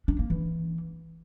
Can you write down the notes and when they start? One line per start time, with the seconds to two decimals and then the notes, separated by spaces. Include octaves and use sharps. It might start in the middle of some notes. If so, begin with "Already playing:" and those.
0.08 D4
0.19 A#3
0.30 E3